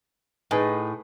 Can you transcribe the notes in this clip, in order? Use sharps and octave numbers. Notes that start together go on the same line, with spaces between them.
A2 D#4 G#4 B4